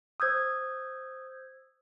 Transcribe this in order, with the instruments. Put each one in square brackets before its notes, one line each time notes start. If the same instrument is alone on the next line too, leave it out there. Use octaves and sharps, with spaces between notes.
[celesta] C5 E6 [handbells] D#6 G6 G#6